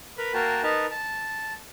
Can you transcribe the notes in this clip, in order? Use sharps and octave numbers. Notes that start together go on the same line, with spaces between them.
A#4 B4 B5
A#3 F#4 A#4 G5 A5
D#4 A#4 B4 A5
A5